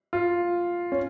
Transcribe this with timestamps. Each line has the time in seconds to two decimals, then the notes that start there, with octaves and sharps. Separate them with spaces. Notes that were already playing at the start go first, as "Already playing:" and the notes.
0.13 F4
0.92 C#4